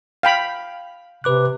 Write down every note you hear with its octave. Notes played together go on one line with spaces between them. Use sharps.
F5 G5 B5
C3 B4 D6 F#6